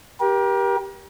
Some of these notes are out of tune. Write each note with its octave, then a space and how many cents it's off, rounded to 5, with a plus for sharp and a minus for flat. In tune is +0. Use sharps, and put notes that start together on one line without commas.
G4 +0 A#4 +35